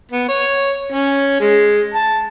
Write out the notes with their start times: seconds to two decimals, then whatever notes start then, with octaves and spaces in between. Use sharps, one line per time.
0.12 B3
0.28 C#5
0.92 C#4
1.41 G#3
1.94 A5